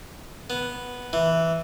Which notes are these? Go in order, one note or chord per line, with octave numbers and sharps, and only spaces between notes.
B3
E3